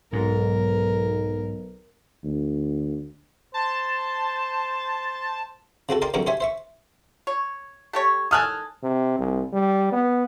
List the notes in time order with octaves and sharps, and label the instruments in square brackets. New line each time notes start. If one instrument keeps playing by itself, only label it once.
[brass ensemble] B1 [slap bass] G#2 [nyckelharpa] A#4
[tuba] D2
[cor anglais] C5 [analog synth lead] A5
[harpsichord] C#3 C4 F#4 A4
A#4 D5 G5 C6
C2 F#2 D3 A#4 G5 C#6
G4 C5 C#5 E5 G#5
C5 E5 C#6
[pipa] C#5
A3 G4 C#5
[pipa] D#3 A4 G#5 [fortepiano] D#6 F6 F#6
[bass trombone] C3
C2
G3
B3